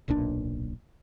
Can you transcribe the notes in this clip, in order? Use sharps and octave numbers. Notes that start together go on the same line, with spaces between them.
D1 B1 A#2 D4